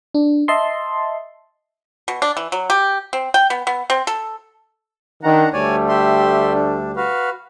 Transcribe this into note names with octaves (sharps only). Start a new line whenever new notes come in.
D4
D#5 E5 A5 C6
B2
D4
E3
F#3
G4
C4
G5
B3
B3
C4
A4
D#3 D4 F#5 A#5
D2 G3 A3 C#5 D5 G#5
G4 E5 C6
D4
F#4 B4 F5